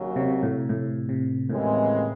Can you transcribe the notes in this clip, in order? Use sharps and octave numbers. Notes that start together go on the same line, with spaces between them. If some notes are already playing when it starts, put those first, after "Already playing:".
Already playing: D#2 C#3 F#3
C3
A2
A2
C3
D#2 A2 C#3 E3 G#3 C4